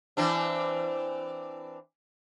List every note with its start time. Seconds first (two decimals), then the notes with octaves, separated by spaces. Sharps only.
0.17 E3 C4 D4